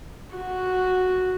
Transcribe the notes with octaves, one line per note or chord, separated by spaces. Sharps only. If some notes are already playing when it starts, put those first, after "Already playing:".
F#4